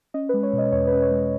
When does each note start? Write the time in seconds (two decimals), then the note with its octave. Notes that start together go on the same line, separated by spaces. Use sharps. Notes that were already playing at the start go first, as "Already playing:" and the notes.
0.14 C#4 D#5
0.29 B4
0.34 G#3
0.43 C#5
0.53 B2
0.58 D#5
0.72 E2 C#5
0.88 B4
0.92 C#4
1.02 C#5
1.11 G#3